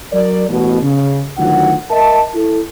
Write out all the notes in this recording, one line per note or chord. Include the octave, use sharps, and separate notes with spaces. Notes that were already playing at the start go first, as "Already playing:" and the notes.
F#3 A#4 D5
A1 B2
C#3
D2 D#3 F#3 F4 F#5
A#4 D#5 E5 A5
E4 A4